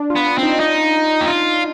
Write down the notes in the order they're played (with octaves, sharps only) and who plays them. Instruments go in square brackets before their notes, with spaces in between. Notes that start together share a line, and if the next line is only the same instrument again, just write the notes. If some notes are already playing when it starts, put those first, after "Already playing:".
Already playing: [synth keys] D4
F4
[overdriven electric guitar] B3
[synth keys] D4
[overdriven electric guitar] C4
[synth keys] D#4
[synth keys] D4 [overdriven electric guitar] D#4
[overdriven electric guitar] G4
F4